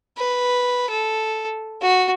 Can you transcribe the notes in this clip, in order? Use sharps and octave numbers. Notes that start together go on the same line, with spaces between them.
B4
A4
F#4